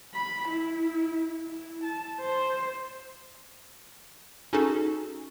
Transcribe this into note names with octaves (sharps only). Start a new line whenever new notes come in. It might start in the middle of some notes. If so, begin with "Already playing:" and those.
B5
E4
E4
A5
C5
C#4 D#4 F#4 G#4 A4